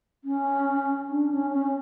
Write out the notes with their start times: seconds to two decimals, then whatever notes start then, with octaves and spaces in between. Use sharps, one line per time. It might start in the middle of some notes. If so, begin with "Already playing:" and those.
0.24 C#4
1.10 D4
1.32 C#4
1.52 C#4